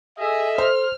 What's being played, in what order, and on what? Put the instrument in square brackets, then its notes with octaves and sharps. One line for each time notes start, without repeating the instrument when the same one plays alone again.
[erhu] G#4 [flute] A4 [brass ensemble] D#5 E5
[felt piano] C5 [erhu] F6